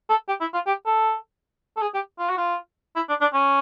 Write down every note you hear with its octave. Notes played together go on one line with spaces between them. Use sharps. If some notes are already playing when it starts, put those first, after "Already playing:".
A4
G4
E4
F4
G4
A4
A4
G#4
G4
F4
F#4
F4
E4
D4
D4
C#4